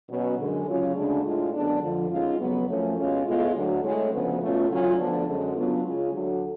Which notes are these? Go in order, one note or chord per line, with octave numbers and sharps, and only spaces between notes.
B2 F#3 C#4
F#2 D3 G#3
C#3 F#3 C#4 F4
D2 C#3 G#3 D4
A2 G#3 D4 F4
F#2 D3 G#3 B3 D4
F2 D3 F3
G#2 G#3 C#4 F4
F2 C#3 F#3 B3
F#2 F3 A3 C#4
B2 G#3 C#4 F4
A2 G#3 B3 F4
D2 D3 F#3
A2 G#3 C#4
D2 C#3 F3 B3
B2 A3 C#4 F4
D2 C#3 F#3 C#4 F4
D2 D3 F3 B3 D4
F#2 D3 G#3
C#3 F#3 B3 D4 F4
C#3 G#3 C#4 F4
D2 D3 F#3